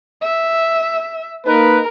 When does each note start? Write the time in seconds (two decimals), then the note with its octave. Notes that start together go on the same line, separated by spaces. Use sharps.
0.22 E5
1.47 A#3 D#4 A#4 B4